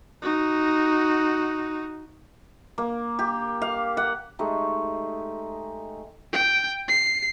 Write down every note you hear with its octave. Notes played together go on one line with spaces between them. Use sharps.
D#4 F#4
A#3
G4
F5
F#5
G#3 A3 D#4 G4
G5
C7